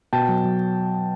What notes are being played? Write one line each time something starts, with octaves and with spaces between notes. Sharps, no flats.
B2 G5 A5
F#3
F#3